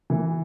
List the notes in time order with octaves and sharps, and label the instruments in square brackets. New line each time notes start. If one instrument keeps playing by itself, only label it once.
[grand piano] E3